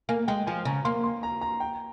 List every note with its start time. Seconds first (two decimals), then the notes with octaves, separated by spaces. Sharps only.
0.09 A#3 G#5
0.28 G#3 G5
0.47 F3 G#5
0.65 C#3 A#5
0.85 A#3 C6
1.04 C6
1.23 A#5
1.41 A#5
1.60 G5